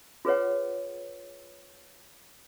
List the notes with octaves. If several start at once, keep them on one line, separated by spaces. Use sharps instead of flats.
F4 G#4 B4 C#5 F#5